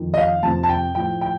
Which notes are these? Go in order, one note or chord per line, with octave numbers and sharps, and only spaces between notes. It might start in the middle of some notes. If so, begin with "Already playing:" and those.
Already playing: F2 D#3
D#5
F5
F2 C3 F3 A5
A5
G5
A2 F3 G5
G5